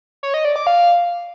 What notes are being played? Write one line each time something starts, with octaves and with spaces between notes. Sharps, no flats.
C#5
D#5
D5
D6
F5